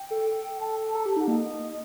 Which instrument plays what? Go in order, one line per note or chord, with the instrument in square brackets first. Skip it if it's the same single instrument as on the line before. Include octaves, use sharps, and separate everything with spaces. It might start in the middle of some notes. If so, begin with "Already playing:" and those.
Already playing: [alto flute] G5
[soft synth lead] A4
[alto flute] A5
[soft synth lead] A4 [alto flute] A#5
[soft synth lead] G4 [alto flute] A5
[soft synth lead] D#4 [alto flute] F#5
[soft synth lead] A#3 [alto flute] D#5